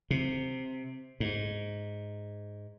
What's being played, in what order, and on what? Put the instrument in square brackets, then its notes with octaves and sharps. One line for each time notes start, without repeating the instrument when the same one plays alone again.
[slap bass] C3
G#2